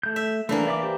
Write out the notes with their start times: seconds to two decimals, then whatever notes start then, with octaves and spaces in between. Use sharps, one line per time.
0.03 A3 G6
0.16 E5
0.49 E3 A3 A#3 D4
0.67 D5 E5 D6
0.83 G4 C5